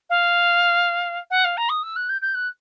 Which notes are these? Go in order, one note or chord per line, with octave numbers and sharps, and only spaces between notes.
F5
F#5
F5
A#5
D#6
E6
F#6
G6
G6
F#6